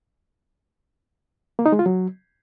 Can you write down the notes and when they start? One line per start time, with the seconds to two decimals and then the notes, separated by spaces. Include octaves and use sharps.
1.59 A#3
1.66 D#4
1.72 G#3
1.79 F4
1.86 F#3